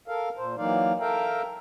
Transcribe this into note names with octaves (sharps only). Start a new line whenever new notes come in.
A4 A#4 F5
A#2 C5
E3 F#3 A#3 D#4 D5 F5
A4 A#4 E5 F5 G5 A#5